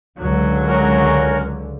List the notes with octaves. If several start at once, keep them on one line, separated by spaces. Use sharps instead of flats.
C#2 D3 F#3
C#4 F#4 A#4